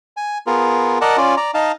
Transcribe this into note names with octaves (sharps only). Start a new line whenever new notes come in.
G#5
B3 F4 G#4 A#4
A#4 D5 D#5 F#5 A5
C#4 F4 D5
D5 A#5
D#4 D#5 F5 A5